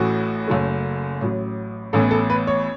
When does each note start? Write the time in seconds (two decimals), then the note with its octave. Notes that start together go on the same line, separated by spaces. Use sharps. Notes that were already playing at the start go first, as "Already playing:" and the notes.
Already playing: A1 A2 E3 A3 F#4
0.48 F#1 F#2 F#3 A3
1.21 A1 A2 F#3
1.93 A1 A2 E3 B3 A4
2.11 A4
2.30 B4
2.47 C#5